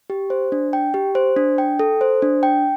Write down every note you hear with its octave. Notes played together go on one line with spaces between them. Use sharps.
G4
C5
D4
G5
G4
C5
D4
G5
A4
C5
D4
G5